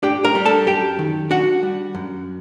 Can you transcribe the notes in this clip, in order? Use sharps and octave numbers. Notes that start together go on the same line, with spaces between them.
D4 G4 G5
A#4 A#5
G3
A4 A5
F#2 G4 G5
D#3
D4 F#4 F#5
G3
F#2